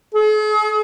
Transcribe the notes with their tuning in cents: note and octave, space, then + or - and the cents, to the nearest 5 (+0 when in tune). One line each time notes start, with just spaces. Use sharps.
G#4 +45